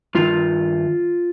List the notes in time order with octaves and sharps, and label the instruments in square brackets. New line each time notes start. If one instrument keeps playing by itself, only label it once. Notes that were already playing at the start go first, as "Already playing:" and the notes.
[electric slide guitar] G2 D#3 F4